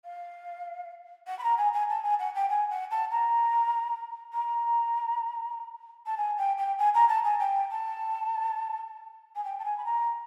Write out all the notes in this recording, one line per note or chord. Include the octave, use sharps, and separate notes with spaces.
F5
F#5
B5
A#5
G#5
G#5
A5
G#5
F#5
G5
G#5
F#5
A5
A#5
A#5
A5
G#5
G5
G5
G#5
A#5
A5
G#5
G5
A5
G#5
G5
A5
G#5
B5
A#5